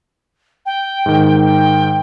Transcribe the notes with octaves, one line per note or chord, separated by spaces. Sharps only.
G5
G#2 D#3
G5